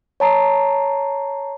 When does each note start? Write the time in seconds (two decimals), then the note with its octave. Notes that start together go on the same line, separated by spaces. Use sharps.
0.20 C#5 A5 A#5 C7